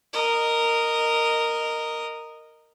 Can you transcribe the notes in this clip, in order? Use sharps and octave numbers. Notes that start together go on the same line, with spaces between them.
A#4 D#5